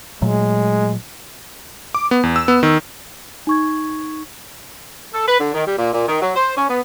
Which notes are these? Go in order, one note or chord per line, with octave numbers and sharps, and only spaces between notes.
A#2 F#3 G#3 A3
D6
B3
E2
E6
B3
D#3
D#4 C#6 G#6
A4
B4
D3
D#3
G3
A#2
A#2
D#3
F#3
C5
C#4
B3